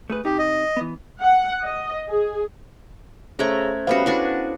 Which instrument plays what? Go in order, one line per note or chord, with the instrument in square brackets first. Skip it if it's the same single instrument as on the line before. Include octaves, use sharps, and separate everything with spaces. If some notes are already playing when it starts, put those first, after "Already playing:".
[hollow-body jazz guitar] A3 G#4 B4
[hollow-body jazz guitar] C3 D#4 [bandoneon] G4
[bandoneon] D#5
[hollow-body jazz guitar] E3 B3
[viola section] F#5
D#5
G#4
[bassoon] C#3 [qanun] A3 A#5 [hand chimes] C#4 C5 G#6
[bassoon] C3 [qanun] G3 B3 F#4 [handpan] C#4 A4 F5
[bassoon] B3 [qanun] D4 F#4 G#5 [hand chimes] E4 C5